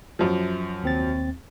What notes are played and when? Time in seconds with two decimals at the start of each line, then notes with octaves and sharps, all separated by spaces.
0.19 F#2 F3
0.83 D#2 C4 A6